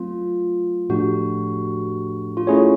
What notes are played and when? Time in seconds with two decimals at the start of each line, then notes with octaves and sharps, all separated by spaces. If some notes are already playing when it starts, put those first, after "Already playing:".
Already playing: F#3 A3 C4 F4
0.89 A2 F3 A3 D4 F#4 G4
2.37 F4
2.47 A3 C#4 E4 F#4 G#4 C#5